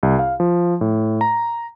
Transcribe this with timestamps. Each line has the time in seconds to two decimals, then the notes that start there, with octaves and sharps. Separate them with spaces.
0.03 C2
0.19 F5
0.40 F3
0.81 A2
1.21 A#5